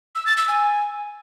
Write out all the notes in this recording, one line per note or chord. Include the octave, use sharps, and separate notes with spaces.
E6
A6
E6
G#5